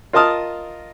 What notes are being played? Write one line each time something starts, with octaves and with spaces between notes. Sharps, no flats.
F4 A#4 D#5 A5 D#6 F6